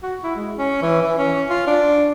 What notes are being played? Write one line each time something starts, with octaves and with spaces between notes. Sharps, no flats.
F#4
E4
G#3
C#4
E3
E3
C#4
F4
D4